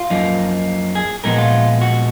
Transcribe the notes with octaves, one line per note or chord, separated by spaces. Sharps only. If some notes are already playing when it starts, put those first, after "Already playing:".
Already playing: F4
F#2 F3 A#3 D#4
G#4
A#2 F3 G#3 B3 D#4 A#4
F4
F#4